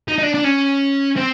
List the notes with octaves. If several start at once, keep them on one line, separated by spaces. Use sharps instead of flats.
D#4
D#4
D4
D4
C#4
C4